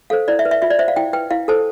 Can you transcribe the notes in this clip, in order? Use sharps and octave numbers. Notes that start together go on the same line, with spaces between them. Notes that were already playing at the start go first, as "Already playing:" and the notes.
A4 C5 F5
E4 D5
E5
B4
E5
F4 E5
D5
C5 E5
F5
E4 G5
B4 G5
E4 F5
A4 C5 A5